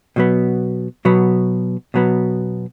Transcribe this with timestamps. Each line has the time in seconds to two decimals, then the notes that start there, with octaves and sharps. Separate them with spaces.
0.16 B2 F#3 B3
1.05 B2 F#3 B3
1.94 B2 F#3 B3